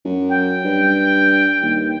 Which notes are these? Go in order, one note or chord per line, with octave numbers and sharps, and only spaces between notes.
F#2
G5
G2
D#2